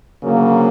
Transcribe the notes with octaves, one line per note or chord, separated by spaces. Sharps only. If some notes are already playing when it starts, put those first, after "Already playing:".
D2 C#3 F#3 A#3